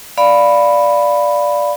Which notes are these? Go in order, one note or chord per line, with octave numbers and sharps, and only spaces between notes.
D5 F5 B5